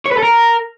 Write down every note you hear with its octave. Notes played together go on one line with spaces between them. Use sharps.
C#5
B4
A4
A#4